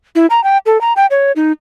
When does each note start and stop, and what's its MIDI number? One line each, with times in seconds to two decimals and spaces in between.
0.15 0.26 64
0.30 0.43 82
0.44 0.58 79
0.66 0.80 69
0.81 0.93 82
0.96 1.06 79
1.10 1.32 73
1.36 1.52 63